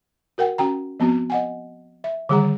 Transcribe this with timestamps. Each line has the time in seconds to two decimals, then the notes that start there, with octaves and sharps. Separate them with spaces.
0.38 F#4 A#4 F#5 G5
0.58 C#4 F#4 G5 A#5
1.00 F3 B3 C4 F#4 A5
1.30 D#5 F#5 G#5
2.04 E5
2.29 D3 D#3 G3 G#4 F#5 A#5